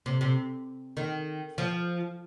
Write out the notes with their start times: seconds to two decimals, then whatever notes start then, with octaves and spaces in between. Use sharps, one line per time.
0.06 C3
0.21 C3
0.97 D#3
1.58 F3